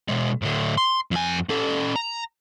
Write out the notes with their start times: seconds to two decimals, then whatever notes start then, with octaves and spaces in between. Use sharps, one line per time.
0.09 B2 G#3
0.42 A2 D3
0.77 C6
1.11 F2 G#5
1.49 C#4 A4
1.96 A#5